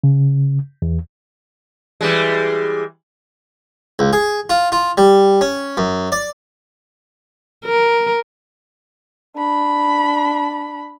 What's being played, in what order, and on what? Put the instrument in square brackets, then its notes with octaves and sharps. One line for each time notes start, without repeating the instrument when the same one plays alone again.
[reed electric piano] C#3
E2
[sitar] E3 G3 G#3
[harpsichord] C#2
G#4
F4
F4
G3
C#4
F#2
D5
[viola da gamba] A#4
[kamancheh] D4 B5